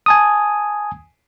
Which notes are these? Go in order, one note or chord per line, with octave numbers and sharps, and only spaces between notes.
G#5 A5 D#6